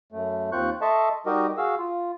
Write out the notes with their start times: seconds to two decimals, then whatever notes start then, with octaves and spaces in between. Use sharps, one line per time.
0.12 F#2 A3
0.52 D#2 C4 F4 C#6 F#6 G6
0.81 A4 D#5 E5 A5 C6 C#6
1.26 G3 D#4 F#4 G4 A#4 D#5
1.57 F#4 G#4 F5 E6
1.78 F4